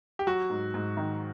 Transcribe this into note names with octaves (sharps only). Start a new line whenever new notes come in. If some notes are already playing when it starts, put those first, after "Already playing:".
G4
F#3 F#4
G#2
G#2
D#3